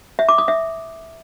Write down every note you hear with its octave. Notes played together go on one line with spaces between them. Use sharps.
E5
D6
D#6
E5